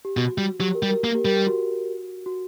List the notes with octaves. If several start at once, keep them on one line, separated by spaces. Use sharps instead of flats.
G4
B2 F#4
G3
F#3 G4
A#4
G3
A#4
A#3 A#4
G4
G3 A#4
G4
F#4
F#4